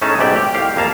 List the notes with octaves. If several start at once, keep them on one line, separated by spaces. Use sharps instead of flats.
A2 A3 C#4 D#4 G#4 A5
B1 G#2 G4 D5 E5 G5
G4
C2 G4 F5
F2 A#3 F5 A5